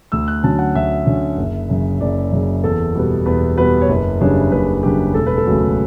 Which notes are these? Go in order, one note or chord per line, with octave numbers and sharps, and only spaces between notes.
D2 E6
F#6
D3 F#3 C#4 A5
F#5
D2 E5
D3 F#3 C#4
F#1
F#2 C#3
F#1 D5
F#2 C#3
E2 A4
B2 G3 B3
E2 B4
B2 G3 B3 B4
C#5
F#1 B4
F#2 C#3 G3 D4 C#5
F#1 B4
F#2 C#3 G3 D4 G4
E1 A4
B4
A4
D2 C#3 F#3